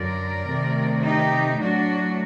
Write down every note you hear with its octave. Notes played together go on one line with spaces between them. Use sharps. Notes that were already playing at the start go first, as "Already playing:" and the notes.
Already playing: F#2 D3 F#3 A#4 D5
C3 D#3 A3
D#4 G4
A2 F#3 A3 D4 F#4